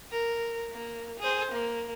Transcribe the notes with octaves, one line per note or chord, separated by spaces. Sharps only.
A#4
A#3
G#4 C5
A#3